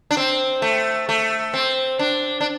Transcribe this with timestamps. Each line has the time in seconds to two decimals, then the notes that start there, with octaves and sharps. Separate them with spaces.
0.11 D4
0.17 C4
0.62 A3
1.09 A3
1.54 C4
1.99 D4
2.41 D4